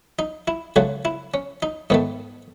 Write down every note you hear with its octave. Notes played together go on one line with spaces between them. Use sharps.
D#4
E4
C#2 C#3 F#3 A3 F#4
E4
C#4
D#4
G#2 D#3 A3 B3